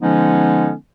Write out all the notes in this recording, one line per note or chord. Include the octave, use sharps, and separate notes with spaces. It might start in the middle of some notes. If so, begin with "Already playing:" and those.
D3 F3 G#3 B3 C#4 D#4